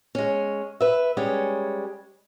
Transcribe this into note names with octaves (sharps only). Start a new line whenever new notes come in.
G#3 C#4
B4 E5
G3 G#3 C#4 C#5 G#5